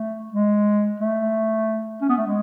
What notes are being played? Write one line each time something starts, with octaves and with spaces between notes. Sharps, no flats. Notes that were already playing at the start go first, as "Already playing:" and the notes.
Already playing: A3
G#3
A3
C#4
B3
A3
G#3